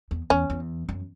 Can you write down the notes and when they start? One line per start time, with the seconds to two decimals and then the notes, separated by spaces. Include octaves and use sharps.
0.11 E2
0.30 E2 C#4
0.50 E2
0.89 F#2